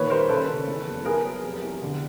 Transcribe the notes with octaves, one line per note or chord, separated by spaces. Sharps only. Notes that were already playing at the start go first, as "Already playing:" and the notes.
Already playing: A#2 D#3 B4 C#5
G3 A#4 C5
C#3 A4 B4
C#3
E2
F#1
B3 G#4 A#4
F#3
F1
E2
D3